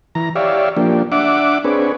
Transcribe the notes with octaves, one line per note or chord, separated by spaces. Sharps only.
E3 A#5
G4 C#5 D5 E5 F5
F3 A#3 D4 G4
D4 E5 F#5 D6
C4 D4 G#4 B4 C#5